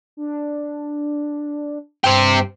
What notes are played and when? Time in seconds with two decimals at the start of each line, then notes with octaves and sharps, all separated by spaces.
0.17 D4
2.04 G2 C4 G4